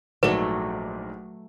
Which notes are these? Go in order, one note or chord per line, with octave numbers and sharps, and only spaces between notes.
A#1 G#2 F#3 A3 B4 D5